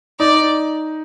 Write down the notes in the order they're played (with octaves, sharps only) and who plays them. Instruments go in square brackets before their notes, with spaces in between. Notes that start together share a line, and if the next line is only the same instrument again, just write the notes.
[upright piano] D#4 [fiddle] D5